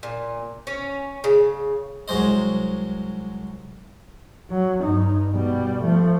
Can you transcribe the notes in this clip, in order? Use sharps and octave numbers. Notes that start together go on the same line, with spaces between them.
A#2
C#4
C#3
C2 F#3 G#3 C5 D#5
F#3
G2 D#4
B2 G3
F3 A3